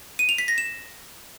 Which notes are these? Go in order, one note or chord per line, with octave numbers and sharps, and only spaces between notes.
D#7
F7
B6
A#6
E7